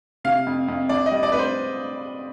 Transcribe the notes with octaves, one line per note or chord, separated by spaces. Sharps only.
C3 F5
F2
F2
F2 D5
D#5
G3
D5
F2 B4
C5